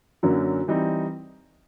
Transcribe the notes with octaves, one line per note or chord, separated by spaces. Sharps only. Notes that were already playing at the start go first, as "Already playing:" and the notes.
F#2 D3 F#3 A#3 C#4
E3 G3 C4 D#4